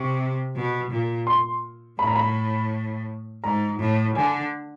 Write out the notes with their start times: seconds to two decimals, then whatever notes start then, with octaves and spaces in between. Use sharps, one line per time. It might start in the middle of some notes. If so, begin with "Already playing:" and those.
Already playing: C3 C#6
0.55 B2
0.91 A#2
1.27 C6
1.99 A2 B5
2.07 A#5
2.16 B5
3.44 G#2 A#5
3.79 A2
4.15 D3 G#5